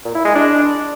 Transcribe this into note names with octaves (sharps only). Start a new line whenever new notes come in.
A#2
E4
G#3
D4